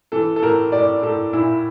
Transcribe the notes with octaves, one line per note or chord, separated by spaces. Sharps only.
E3 A4
A4
A2 A#4
A2 D5
A2 A4
A#2 E4